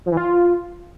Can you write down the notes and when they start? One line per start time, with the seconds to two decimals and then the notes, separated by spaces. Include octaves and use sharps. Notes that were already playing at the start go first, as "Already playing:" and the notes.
0.06 F3
0.11 E3
0.17 F4